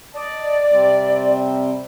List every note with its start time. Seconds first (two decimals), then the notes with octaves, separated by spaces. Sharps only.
0.15 D5 D#5 A5
0.71 C3 G3 C4